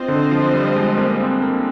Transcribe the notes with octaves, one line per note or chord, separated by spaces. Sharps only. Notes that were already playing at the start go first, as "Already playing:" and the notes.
Already playing: C4 F4 C5 D#5
D3
F3
G3
G#3
A#3
C4
A#3